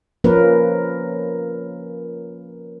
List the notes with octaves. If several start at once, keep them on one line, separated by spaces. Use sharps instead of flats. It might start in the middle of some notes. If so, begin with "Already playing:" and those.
F3 A#3 C#4 A#4 B4